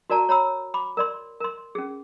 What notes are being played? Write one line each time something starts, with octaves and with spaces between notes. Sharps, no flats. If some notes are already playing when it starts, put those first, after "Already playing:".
F#4 A#4 D5 A5 A#5
C#5 A#5 B5 E6
B5 D6
A#4 D5 C6
A#4 C6
C#4 G#4